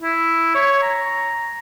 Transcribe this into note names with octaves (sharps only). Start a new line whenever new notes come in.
E4
C#5
A#5